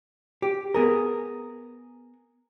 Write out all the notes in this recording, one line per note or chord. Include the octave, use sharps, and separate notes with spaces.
G4
B3 G#4 A#4